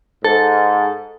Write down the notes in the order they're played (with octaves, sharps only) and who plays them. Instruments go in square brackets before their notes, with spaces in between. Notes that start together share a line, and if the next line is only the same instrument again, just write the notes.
[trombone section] G#2 [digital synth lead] A4